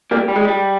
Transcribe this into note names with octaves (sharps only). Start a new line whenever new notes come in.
G3 A#3
G3
G#3
G3